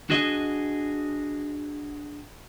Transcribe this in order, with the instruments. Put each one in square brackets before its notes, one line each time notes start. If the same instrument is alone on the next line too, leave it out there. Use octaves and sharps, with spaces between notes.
[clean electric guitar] D4 F#4 G#4 D#5